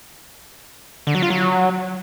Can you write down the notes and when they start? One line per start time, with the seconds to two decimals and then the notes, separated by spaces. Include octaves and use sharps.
1.07 D3
1.15 F#3
1.22 F4
1.30 F#3